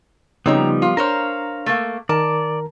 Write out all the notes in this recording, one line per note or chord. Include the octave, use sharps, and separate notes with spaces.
C#3 F3 G3 B3 C4 D#4 C#5 A#5
F4
D4 A#4 C5 C#5 F5 A#5
A3 A#3
D#3 A#4 D5 A5 A#5